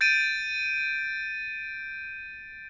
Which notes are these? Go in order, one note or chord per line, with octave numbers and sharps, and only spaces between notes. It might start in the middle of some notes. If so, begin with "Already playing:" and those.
G6 A6 D7 D#7